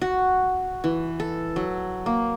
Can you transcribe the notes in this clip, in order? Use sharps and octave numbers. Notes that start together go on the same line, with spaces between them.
F#4
E3
A4
F#3
A#3